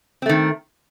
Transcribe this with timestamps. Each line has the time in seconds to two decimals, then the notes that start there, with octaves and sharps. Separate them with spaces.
0.22 C4
0.26 A3
0.29 D#3